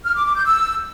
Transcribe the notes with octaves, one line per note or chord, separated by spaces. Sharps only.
F6
D6
D6
G6
E6